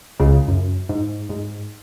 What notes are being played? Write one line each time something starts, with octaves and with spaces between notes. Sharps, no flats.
C#2 C#3
F#2
G#2
G#2